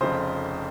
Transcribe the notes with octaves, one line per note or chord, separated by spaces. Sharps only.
F1 F2 C#3 C5